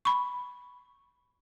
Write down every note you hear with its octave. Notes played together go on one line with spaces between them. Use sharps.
B5 C#6